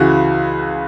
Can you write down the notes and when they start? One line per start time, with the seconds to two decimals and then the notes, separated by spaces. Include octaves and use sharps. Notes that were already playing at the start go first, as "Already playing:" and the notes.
Already playing: C#2 C#3 E3 F#4